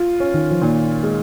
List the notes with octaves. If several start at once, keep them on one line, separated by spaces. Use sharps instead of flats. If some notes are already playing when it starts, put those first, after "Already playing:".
Already playing: F4
C#4
D#3
F3
A#2 D#3
G#3